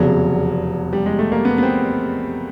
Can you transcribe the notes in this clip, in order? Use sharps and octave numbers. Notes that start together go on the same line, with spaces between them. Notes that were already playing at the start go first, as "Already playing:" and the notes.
Already playing: F1 E2 C#3 F#3
G3
G#3
A3
A#3
B3
B3
C4